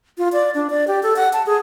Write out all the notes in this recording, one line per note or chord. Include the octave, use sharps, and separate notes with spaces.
F4
D5
D4
D5
G4
A4
F#5
A5
G#4